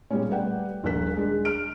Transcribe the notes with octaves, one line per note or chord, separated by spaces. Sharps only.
A#2 G3 G#3 B3 C#4
G3 A3 B4 D5 F#5 G5
D#1 A#1 A#2 A#4 F#6 B6
G#3 D4
F6 D7